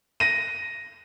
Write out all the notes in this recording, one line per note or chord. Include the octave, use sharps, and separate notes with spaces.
A#6 D#7